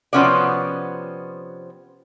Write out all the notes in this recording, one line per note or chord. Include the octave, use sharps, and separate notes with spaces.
C3 F3 B3 C#4 F#4 D5